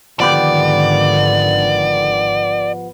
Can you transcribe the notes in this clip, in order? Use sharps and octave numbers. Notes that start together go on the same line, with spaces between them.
G#1 D3 D#3 F3 B3 G4 D5